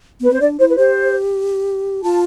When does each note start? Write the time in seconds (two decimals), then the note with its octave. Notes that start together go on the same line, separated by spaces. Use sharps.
0.20 B3 B4
0.30 C4 C5
0.41 D4 D5
0.59 E4 C5
0.69 B4
0.78 G4 C5
2.03 F4 A5